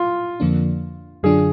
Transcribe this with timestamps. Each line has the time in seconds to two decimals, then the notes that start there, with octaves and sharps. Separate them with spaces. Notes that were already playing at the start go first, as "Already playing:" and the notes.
Already playing: F4
0.40 F2 D3 F3 A#3 D4
1.23 F#2 D3 F#3 D4 F4 G#4